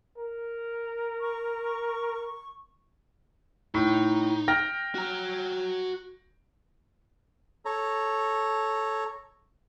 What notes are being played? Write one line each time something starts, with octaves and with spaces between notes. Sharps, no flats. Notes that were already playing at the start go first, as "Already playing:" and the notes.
A#4
C#6
A2 D#4
G5 F6 A#6
F#4 A#5
A4 C#5 A#5